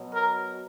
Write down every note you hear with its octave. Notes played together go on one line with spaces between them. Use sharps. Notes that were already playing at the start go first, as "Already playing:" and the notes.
Already playing: B2 F#3
A#4